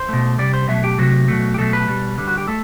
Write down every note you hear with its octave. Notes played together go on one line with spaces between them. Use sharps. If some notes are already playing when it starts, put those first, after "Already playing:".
Already playing: C5
B2 A3
C3 G3 D5
C5
B2 F#3 A3 E5
G4
C3 F#3 A3 F#4
B2 F#3 A3
G4
B2 F#3 A3 A4
B4
B2 G3
D3 G3
F#4
G4
A3 A4